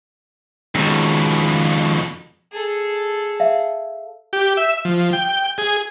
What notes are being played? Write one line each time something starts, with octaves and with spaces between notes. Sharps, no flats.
F2 B2 D#3 G#3 C#4
G#4 A4
E5 F5
G4
E5
F3
G5
G#4